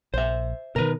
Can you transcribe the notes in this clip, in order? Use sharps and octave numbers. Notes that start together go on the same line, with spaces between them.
A#1 C5 E5
B2 D3 D#3 A#4 B4